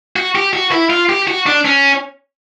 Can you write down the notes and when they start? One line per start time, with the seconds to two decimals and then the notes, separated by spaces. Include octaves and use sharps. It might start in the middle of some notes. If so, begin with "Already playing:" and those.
0.16 F#4
0.35 G4
0.53 F#4
0.72 E4
0.90 F4
1.09 G4
1.28 F#4
1.46 D4
1.65 C#4